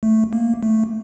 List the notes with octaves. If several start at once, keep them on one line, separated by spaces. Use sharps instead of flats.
A3
A#3
A3